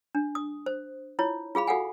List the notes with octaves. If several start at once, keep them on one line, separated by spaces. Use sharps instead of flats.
D4
D#6
C5
E4 F4 C#5
F4 G#4 F5 B5
F#4 A4 F5 F#5 G#5